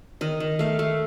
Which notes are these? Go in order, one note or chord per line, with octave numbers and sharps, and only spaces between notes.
D#3 D#5
D#3
A3 F5
A3